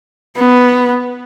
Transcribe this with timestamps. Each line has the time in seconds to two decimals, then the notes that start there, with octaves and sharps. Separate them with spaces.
0.37 B3